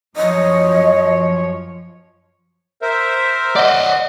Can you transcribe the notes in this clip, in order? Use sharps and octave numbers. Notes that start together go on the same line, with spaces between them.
F#2 F3 C#5 D#5
A#4 C5 E5
D5 D#5 F#5